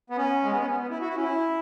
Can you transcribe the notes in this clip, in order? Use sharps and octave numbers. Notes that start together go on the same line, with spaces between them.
B3
C#4
G#3
B3
C#4
B3
B3
E4
F#4
E4
C#4
E4